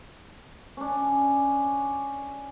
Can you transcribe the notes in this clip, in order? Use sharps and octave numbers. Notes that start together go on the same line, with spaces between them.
C#4 D4